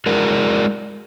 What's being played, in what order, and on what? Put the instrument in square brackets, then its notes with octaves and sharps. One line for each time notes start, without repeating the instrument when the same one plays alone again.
[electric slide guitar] G#3 D4 E4 F#4 G#4 A#4